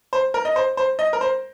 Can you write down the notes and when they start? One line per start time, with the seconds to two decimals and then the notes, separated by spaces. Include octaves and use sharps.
0.13 C5
0.34 A#4
0.45 D#5
0.56 C5
0.77 C5
0.99 D#5
1.13 A#4
1.21 C5